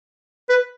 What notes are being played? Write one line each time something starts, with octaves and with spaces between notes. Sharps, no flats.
B4